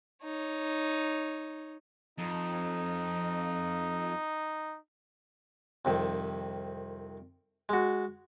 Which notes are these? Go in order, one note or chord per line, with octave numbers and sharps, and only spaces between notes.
D#4 C#5
F2 D#4
C2 F2 D#3
G#3 F#4